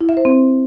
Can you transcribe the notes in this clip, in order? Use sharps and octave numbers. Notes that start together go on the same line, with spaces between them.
E4
E5
C5
C4